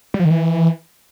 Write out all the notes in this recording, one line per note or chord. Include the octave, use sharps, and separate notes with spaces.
G3
F3
D#3
E3